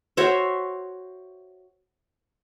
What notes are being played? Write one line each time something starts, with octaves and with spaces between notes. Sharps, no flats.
F#4 C5 C#5 E5